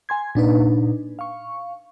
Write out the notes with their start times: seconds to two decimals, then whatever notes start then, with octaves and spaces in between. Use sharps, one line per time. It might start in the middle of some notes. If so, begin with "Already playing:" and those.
0.09 G#5 C6 G#6
0.35 A#2 D4 D#4 B4
1.19 F5 C#6